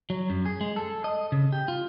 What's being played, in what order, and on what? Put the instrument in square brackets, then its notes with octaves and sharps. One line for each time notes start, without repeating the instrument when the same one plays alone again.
[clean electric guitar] F#3
F#2
G#4
G#3
A4
D#5
C#3
G4
F4